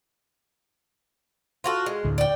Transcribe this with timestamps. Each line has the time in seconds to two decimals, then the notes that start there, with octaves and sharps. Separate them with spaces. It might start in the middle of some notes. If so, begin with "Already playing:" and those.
1.64 F4 F#4 A4
1.86 G#3
2.05 D2 A2
2.18 D5 G5